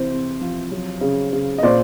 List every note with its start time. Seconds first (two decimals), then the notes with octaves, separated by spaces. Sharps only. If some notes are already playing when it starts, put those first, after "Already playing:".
Already playing: C3 E3 C5
0.11 C3
0.41 F3
0.72 F#3
1.01 C#3
1.33 C#3
1.58 D#5
1.63 A#2 C5 D5